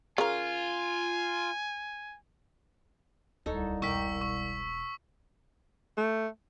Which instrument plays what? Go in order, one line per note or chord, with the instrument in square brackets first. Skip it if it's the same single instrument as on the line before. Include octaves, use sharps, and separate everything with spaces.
[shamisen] C#3 A#4 [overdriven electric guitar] F4 [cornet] G#5
[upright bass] D1 [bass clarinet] C2 [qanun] D#4 A4 C#5
[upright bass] E1 B2 [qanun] A#4 G5 D6 [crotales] C#6 E6 B6
[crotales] C#6
[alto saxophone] A3